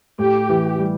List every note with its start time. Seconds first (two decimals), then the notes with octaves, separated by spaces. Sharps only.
0.19 A2 G4
0.49 E3
0.78 G3